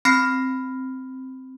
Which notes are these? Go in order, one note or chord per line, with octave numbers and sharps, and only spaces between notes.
C4 B5 F6 A#6 C7